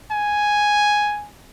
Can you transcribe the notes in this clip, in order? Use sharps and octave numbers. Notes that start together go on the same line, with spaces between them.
G#5